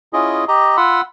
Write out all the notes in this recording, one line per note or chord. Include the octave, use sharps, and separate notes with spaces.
C#4 E4 F4 G#4 D#5
G4 D#5 A#5
F4 F#5 B5 C6 E6